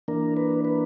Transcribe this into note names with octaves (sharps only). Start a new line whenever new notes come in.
E3 A#3 D4 A#4
B4
B4